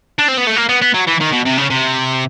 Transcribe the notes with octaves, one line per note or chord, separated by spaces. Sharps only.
D4
C4
B3
A3
A#3
B3
B3
F#3
E3
D#3
B2
C3
C#3
C3